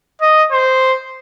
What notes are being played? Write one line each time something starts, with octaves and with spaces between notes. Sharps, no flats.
D#5
C5